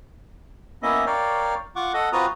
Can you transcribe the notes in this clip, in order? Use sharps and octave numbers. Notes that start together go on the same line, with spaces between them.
A#3 B3 C#4 E4 D#5 E5
A#4 C#5 D5 F5 G5
F4 F#5 C#6 D6
A4 D#5 F#5
C4 F4 F#4 B4 A#5 D#6